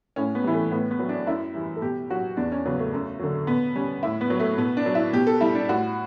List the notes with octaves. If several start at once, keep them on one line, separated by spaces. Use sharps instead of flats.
A2 C#4
B3
E3 G3
A3
A2 B3
B3
F#3
D4
F#2 E4
E3 G3
A4
B2 G4
F#3 F#4
E2 D4
C#4
C#3 F#3 B3
A3
F#2
D3 F#3
B2 B3
G3 C#4
A2 E4
B3
F#3
A3
B2 B3
D4
F#3
E4
B2 G4
A4
G3 E4
D4
A2 F#4